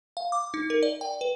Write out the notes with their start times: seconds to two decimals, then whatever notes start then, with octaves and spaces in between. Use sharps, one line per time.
0.17 F5
0.32 D6
0.54 D#4
0.70 A#4
0.83 D5
1.01 G5
1.21 B4